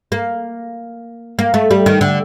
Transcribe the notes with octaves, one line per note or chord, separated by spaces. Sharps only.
A#3
A#3
A3
G3
D#3
D3